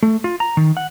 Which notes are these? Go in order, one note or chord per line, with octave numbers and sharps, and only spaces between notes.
A3
F4
A#5
D#3
F#5